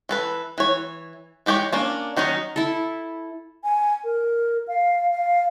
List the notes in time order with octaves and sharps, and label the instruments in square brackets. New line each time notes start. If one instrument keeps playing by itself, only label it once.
[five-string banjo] E3 A4 B4
E3 C#5
E3 G#3 G4 G#4 C#5
A#3 C#4 D4
D#3 F#3 C#4 D#4
[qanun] E4 A4
[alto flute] G#5
A#4
F5
F5